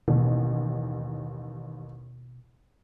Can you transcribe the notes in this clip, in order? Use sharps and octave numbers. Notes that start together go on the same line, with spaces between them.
A1 D#2 B2